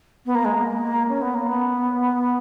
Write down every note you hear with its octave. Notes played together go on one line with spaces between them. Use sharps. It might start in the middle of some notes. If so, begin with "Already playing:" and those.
B3
A#3
G#3
A#3
C#4
B3
A#3
B3